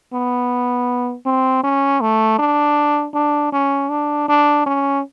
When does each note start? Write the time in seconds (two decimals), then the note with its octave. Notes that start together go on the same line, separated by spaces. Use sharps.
0.13 B3
1.26 C4
1.63 C#4
2.01 A3
2.39 D4
3.14 D4
3.52 C#4
3.89 D4
4.28 D4
4.66 C#4